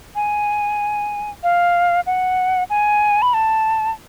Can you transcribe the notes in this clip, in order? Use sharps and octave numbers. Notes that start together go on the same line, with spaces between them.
G#5
F5
F#5
G#5
B5
A5